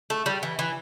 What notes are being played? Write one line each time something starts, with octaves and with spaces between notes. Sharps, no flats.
A3
G3
E3
E3